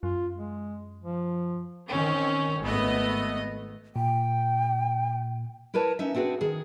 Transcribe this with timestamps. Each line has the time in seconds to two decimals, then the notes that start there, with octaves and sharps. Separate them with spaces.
0.03 F#2 F4
0.35 G#3
1.03 F3
1.90 D#3 C4 C#4
2.62 G#1 A3 B3 D#5
3.96 A#2 G5
5.74 E4 A#4 B4 C#5 A5
5.99 C#4 D#4 E5
6.14 C4 D4 F#4 G#4 B4
6.41 D#3 G#4